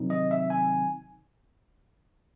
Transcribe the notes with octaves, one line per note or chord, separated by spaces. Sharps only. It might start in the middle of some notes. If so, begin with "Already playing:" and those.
Already playing: C3 D#3 F#3 C4 D#4
D#5
E5
G#5